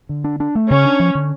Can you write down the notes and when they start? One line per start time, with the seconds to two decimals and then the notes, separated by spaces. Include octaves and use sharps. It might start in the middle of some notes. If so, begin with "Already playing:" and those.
0.09 D3
0.24 D4
0.40 D4
0.55 A3
0.69 C#3 C#4
0.85 D4
1.00 F3
1.15 D3